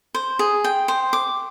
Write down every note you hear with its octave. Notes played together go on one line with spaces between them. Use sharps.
C5
G#4
G5
C5
D6